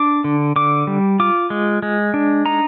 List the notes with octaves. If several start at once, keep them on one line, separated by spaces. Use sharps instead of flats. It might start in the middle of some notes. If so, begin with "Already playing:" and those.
Already playing: D4 D6
D3
D3 D6
G3
F4 D6
G#3
G#3
D4
D#4 A#5